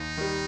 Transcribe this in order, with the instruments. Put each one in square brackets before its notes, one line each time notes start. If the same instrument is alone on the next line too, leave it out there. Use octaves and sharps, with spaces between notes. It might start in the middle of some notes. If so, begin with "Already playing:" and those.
Already playing: [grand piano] D#2 [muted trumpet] D#4
[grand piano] D#3 G3